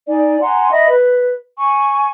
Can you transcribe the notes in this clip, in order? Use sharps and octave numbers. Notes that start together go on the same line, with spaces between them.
D#4 D5 G#5
F#5 G#5 A#5 C6
D#5 E5 B5
B4
G#5 C#6